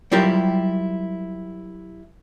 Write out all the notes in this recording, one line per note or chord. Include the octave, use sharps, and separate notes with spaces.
F#3 G3 E4 F4 G4 A#4